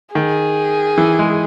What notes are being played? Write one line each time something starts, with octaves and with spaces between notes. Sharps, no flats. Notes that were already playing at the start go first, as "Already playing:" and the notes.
D#3 G#4
E3
G#3